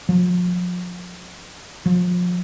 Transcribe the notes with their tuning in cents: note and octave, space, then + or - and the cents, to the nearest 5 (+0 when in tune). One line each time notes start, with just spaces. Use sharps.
F3 +40
F3 +35